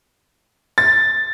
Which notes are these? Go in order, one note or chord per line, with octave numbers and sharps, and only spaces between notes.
A6